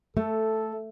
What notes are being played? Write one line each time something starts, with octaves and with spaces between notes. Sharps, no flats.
A3 A4